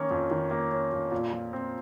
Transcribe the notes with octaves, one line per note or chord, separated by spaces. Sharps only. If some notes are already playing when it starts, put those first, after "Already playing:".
Already playing: D#3 A#3 C#4
F2
D#3
A#3
C#4
F2
A#2
F3
C4